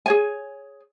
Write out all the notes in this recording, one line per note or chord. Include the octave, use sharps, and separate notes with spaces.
G#4 C#5 G#5